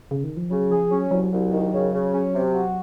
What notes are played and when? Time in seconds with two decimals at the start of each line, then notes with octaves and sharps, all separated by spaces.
0.11 C#3
0.24 D#3
0.37 F3
0.50 C#3 F#3
0.70 F3 G#4
0.91 F#3 C#4
1.11 C2 F#3
1.32 C2
1.52 D#3
1.73 C#3
1.93 C#3
2.13 C#4
2.34 C3
2.54 F#4